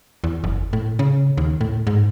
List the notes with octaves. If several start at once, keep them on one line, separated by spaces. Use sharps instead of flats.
E2
F#1
A2
C#3
D#2
A2
G#2